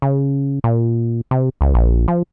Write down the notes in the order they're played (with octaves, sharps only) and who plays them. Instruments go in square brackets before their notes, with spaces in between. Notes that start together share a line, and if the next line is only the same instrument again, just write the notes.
[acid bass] C#3
A#2
C3
C#2
A#1
F3